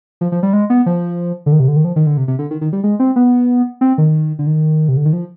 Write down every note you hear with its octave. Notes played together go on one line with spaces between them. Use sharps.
F3
F3
G3
G#3
B3
F3
D3
D#3
C3
D3
D#3
F3
D#3
D3
C3
C3
D3
D#3
D#3
G3
G#3
C4
B3
C4
D#3
D3
D#3
C3
D3
D#3
F3